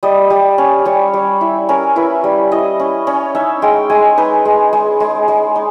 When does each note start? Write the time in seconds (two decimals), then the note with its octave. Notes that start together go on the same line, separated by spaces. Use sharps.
0.03 G3 D#5
0.30 G3
0.58 C#4
0.85 G3 C#5
1.14 G3
1.41 E4
1.69 C#4 A#4
1.96 E4 B4
2.24 G3
2.51 E4 D#5
2.79 C#4
3.07 C#4
3.35 D#4 E5
3.62 G#3 G5
3.90 G#3 G#5
4.17 D#4 B4
4.45 G#3
4.73 G#3
5.00 G#3
5.28 G#3
5.55 D#4